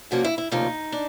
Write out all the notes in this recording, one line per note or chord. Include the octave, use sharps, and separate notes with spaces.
D2 C3 F3 A#3 C#4 F#4
E4
E4
D2 C3 F3 A#3 C#4 D#4
D4